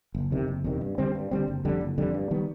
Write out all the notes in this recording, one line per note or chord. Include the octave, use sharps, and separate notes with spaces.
F#1
E2 C3 D#3
F#1
E2 C3 D#3
G2
D3 G3 C4
G2
D3 G3 C4
F#1
F2 D3 G3
F#1
F2 D3 G3
G2
D#3 G3 B3